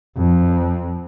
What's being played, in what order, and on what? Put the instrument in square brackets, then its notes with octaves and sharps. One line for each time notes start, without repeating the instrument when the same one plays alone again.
[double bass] F2